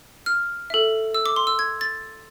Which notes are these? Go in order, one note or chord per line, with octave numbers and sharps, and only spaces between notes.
F6
A4 E5
E6
D6
C6
E6
G#6
A6